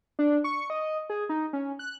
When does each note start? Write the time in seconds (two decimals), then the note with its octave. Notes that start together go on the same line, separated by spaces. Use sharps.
0.19 D4
0.44 C#6
0.70 D#5
1.10 G#4
1.29 D#4
1.53 C#4
1.79 F#6